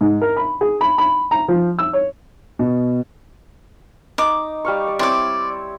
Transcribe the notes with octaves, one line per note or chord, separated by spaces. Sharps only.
G#2
A#4
B5
G#4
B5
B5
A#5
F3
E6
C#5
B2
D#4 D6
G3 F5 C#6
D5
C4 E4 C#5 D5 D6